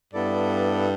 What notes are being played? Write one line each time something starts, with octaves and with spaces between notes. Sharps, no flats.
G2 B3 E4 A4 D5